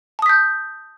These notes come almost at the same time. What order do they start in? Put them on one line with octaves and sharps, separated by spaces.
A5 D#6 B6 G6